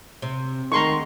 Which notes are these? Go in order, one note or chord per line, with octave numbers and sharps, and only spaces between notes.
C3
D2 D#3 G#3 A#5 C6 C#6